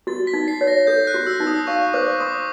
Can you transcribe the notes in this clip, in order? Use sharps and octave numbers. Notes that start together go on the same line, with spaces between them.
F#4 A6
B6
D#4
C7
C#5
A#6
A4 G6
F#6
F#4
E6
D#4
D#6
F5 C#6
C5 D6
C6 D#6